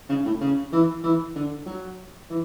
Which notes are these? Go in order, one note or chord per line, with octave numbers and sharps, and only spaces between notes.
C#3
A2
C#3
E3
E3
D3
F#3
E3